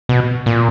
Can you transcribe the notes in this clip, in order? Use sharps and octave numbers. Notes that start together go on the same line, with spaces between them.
B2
A#2